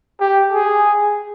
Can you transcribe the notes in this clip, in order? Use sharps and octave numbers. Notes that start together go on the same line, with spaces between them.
G4
G#4